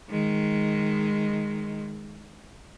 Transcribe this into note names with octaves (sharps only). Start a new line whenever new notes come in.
D#3 G#3